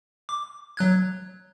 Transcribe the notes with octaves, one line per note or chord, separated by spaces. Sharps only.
D6
F#3 F#6 G#6